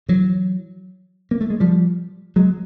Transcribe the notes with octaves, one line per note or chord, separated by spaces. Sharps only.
E3 F#3
A#3
A3
G#3
F3 G3
F#3 G#3